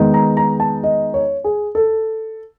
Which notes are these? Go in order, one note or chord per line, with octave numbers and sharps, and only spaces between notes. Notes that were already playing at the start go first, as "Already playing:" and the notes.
Already playing: D#3 G#3 B3 D#4
A#5
A#5
A5
D#5
C#5
G#4
A4